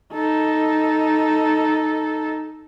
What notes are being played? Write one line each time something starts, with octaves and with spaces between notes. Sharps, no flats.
D#4 A4